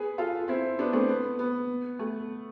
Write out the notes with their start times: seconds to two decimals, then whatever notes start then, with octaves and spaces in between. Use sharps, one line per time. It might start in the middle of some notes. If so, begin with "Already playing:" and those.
Already playing: G#4 B4
0.18 F4 A4
0.48 C4 E4
0.79 B3 D4
0.93 A3 C4
1.09 B3
1.39 B3
1.99 A3